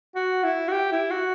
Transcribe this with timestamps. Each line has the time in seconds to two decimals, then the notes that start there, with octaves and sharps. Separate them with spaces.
0.15 F#4
0.44 E4
0.68 F#4
0.72 G4
0.92 E4
1.11 F#4